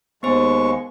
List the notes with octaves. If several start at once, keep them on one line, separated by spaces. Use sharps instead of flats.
D#2 G#3 B3 C5 C#6